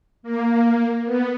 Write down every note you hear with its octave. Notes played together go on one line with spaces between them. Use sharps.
A#3
B3